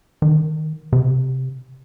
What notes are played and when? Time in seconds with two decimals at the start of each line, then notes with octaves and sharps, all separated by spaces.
0.22 D#3
0.92 C3